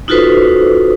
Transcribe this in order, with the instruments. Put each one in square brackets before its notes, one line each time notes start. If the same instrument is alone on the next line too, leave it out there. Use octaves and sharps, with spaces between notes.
[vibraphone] D#4 F4 F#4 A4 B4 C5